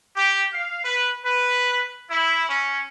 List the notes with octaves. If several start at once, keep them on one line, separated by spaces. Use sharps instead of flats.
G4
F5
B4
B4
E4
C#4